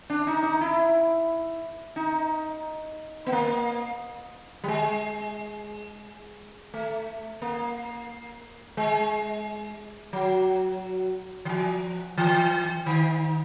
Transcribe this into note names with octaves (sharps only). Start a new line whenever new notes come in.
D4
D#4
D#4
E4
D#4
B3
A#3
G3
G#3
A3
A#3
G#3
F#3
E3
F3
E3
D#3